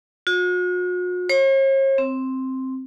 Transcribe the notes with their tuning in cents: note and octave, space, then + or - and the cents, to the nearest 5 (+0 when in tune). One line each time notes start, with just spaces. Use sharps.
F#4 -45
C#5 -45
C4 +0